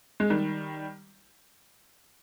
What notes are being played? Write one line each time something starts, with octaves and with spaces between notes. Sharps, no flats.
G#3
D#3 G3